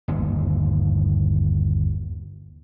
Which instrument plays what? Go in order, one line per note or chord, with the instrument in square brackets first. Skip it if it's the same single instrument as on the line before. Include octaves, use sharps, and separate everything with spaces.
[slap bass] G1 D#2